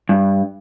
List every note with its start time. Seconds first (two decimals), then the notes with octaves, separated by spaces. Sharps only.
0.09 G2